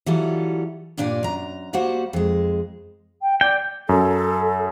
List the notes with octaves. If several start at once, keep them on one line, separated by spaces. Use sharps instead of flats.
E3 F#3 G3 F4 A4
G2 A#2 D4 D5 G#5
F#2 A#5
G3 A#3 F#4 C5 F#5
F2 G#3
G5
D5 G5
F#2 A4